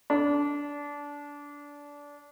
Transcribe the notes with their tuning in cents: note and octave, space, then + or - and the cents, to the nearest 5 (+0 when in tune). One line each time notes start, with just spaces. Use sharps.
D4 -20